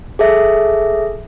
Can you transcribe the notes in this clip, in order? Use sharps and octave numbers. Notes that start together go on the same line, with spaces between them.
G#4 A4 E5